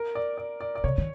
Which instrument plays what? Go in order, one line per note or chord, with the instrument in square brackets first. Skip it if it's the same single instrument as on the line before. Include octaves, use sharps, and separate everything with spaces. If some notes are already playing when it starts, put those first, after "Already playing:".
Already playing: [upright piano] A#4
D5
D5
D5
D5
[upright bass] C3 [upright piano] C#5
[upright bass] D#3